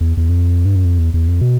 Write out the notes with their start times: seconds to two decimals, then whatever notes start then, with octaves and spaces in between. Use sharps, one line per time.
0.01 E2
0.17 E2
0.29 F2
0.65 G2
0.76 F#2
0.85 F2
0.99 E2
1.14 E2
1.28 F2
1.41 B2